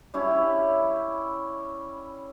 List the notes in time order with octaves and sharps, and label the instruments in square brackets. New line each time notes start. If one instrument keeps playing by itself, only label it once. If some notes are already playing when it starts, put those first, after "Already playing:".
[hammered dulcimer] G3 C#4 E4